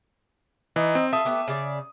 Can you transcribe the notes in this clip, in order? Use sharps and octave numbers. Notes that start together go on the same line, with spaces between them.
E3 D#4
C4
F4 A4 E5 D#6
A3 B3 G4
C#3 D5